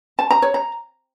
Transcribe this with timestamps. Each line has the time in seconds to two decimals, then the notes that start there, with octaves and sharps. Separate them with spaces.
0.19 A5
0.31 A#5
0.42 C#5
0.54 A#5